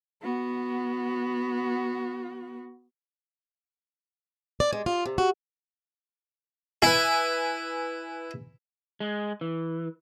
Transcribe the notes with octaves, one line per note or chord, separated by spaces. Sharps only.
B3 F#4
D5
G#3
F4
C3
F#4
E4 B4 G#5
G#3
E3